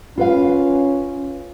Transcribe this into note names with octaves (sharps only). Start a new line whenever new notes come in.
C#4 F4 B4 F5